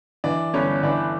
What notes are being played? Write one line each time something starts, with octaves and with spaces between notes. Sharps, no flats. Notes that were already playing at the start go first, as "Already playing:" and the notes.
E3 D4 D5
G1 C#4 C#5
E3 D4 D5